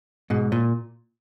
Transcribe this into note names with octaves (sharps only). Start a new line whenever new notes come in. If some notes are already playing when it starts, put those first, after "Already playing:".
G#2 B2
A#2